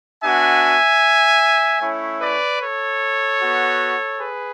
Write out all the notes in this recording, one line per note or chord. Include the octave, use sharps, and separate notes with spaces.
B3 D4 F#4 E5 G#5
A3 C#4 E4 C#5 E5
B4 D5
A4 C#5
B3 F#4
G#4 B4